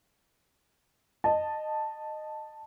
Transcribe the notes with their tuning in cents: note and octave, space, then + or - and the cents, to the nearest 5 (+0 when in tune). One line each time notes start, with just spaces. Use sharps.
D#5 -15 A5 +0